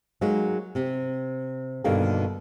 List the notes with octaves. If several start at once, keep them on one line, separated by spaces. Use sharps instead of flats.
F#3 G#3 A#3 D#4
C3
G2 B2 D3 D#3 A#3 G4